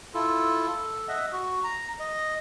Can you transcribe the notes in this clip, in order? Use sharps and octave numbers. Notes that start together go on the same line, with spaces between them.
E4 F4 A4
A4
D#5 E5 F#5
F#4
A#5
D#5